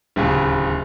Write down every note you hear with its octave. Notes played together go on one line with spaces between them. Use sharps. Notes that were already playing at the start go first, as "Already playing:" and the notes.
D1 D#2 C#3